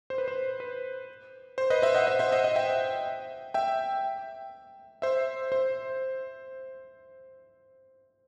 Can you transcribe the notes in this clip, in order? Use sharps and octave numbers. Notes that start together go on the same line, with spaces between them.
C5
B4
C5
B4
C5
B4 D#5
C5 E5
D#5 F#5
C5 E5
C5 E5
D#5 F#5
D#5 F#5
E5 G5
E5 G5
C5 E5
C5